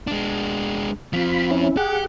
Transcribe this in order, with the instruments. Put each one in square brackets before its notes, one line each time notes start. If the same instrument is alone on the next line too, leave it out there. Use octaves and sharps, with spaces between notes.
[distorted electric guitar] G#3 D4
[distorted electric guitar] F3 C4 [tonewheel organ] F4 B5
[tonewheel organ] C#4 E4
[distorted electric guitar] G4 [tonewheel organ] G#4 F#5